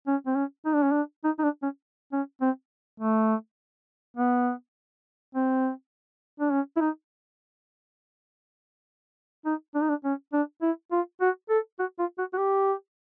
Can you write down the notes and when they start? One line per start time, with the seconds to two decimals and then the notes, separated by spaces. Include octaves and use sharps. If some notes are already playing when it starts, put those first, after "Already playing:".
0.07 C#4
0.26 C4
0.36 C#4
0.66 D#4
0.74 D4
0.83 C#4
0.92 D4
1.24 D#4
1.39 D#4
1.43 D4
1.63 C#4
2.13 C#4
2.41 C4
3.00 A3
4.17 B3
5.35 C4
6.40 D4
6.52 C#4
6.77 E4
6.81 D#4
9.45 D#4
9.75 D4
9.82 D#4
9.89 D4
10.04 C#4
10.33 D4
10.62 E4
10.92 F4
11.21 F#4
11.50 A4
11.79 F#4
11.99 F4
12.18 F#4
12.33 F#4
12.38 G4